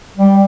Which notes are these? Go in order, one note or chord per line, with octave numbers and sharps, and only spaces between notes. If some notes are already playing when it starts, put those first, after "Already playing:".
G3